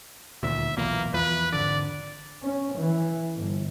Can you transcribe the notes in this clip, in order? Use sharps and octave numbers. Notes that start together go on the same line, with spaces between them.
D#1 D2 A#2 E5
B1 E2 A#2 A#3
E2 E3 F3 B4
G#1 D3 D5
C#4
E3
G1